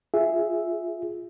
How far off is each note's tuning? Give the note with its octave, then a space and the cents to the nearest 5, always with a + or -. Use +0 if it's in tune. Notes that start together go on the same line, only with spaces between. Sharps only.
F4 +0 G#4 +0 E5 +0